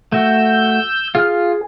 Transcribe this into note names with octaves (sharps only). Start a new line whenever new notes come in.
A3 F#4 E6 G6
F4 G#4 F6